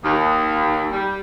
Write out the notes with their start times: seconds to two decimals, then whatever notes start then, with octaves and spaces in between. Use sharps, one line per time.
0.03 D#2
0.91 G3